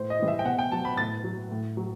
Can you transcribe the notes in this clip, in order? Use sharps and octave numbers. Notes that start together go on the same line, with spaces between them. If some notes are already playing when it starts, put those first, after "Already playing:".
Already playing: A2 C5
D#5
E3 G3
E5
G5
B2 F#5
G5
F#3 A5
B5
A2 A6
F#3
A2
F#3